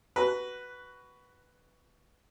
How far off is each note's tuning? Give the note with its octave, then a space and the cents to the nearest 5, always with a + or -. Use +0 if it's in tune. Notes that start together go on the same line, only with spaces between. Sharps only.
F#4 +15 B4 +0